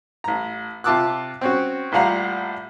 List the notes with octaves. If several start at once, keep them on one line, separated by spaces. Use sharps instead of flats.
A1 A#5
C3 F4 A5 D6 E6 F#6
C4 C#4 F#4
A1 A#2 G3 F5 F#5 A#5